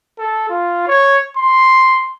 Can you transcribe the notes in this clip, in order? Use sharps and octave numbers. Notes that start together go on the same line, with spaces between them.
A4
F4
C#5
C6